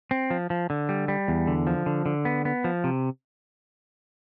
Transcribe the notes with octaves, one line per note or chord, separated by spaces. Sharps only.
C4
F3
F3
D3
G3
G3
E2
D3
F3
D3
D3
B3
B3
F3
C3